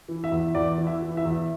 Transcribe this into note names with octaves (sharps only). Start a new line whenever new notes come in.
E3
E5
E2
E2 D5
E3
E5
E3
E5
E2